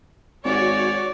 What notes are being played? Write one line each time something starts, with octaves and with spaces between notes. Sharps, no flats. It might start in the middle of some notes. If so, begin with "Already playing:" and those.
G#1 F#4 C#5 D5